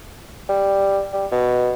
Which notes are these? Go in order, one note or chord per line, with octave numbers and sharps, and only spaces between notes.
G3
G3
B2